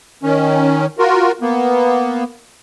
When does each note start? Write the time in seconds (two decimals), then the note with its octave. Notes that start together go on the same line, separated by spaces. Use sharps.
0.23 D#3 C#4
0.99 F4 F#4 A#4
1.41 A#3 B3